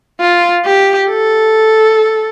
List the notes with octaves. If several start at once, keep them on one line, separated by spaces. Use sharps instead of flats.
F4
G4
A4